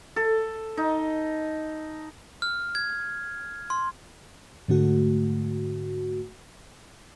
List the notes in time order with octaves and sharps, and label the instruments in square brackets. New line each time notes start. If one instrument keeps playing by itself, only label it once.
[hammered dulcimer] A4
D#4
[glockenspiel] F6
G#6
C6
[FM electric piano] G#2 D3 A3 F#4